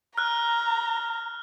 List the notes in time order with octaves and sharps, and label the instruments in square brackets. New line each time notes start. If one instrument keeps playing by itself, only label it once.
[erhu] A#5 [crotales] F6 F#6